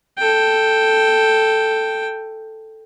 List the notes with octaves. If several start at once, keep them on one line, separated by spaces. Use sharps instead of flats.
A4 G5